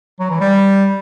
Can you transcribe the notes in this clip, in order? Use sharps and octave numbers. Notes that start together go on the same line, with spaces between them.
F#3
E3
G3